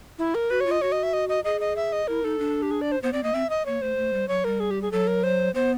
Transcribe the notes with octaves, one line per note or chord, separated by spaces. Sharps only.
E4
A#4
F#4 B4
C#5
F4
D#5
F#4 C#5
D#5
E5
D#5
D#5
G#4 D#5
D#5
E5
D#5
E4 A#4
D#4 A4
D4
G4
G#4
D5
C5
B3 C5
C4 D5
A#3 D#5
C4 E5
D#5
A#3 C#5
A3 C5
A3
G3
F#3 C#5
G3 A#4
G#4
G4
G#4
F#3 A4
A#4
C5
B3 C5